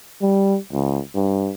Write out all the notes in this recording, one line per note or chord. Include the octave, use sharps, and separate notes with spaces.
G3
C#2
G2